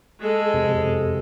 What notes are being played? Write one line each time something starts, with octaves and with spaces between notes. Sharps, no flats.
G#3 A4
F2 C3